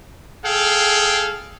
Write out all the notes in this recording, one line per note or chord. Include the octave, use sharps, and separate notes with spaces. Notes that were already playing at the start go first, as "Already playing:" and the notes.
G#4 A4 F5 G5